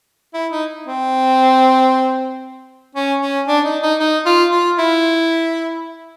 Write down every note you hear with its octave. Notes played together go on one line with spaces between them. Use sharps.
E4
D#4
C4
C#4
C#4
D4
D#4
D#4
D#4
F4
F4
E4